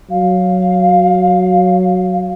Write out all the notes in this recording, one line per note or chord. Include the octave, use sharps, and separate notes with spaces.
F#3 F5